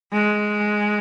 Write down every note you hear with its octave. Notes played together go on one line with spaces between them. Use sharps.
G#3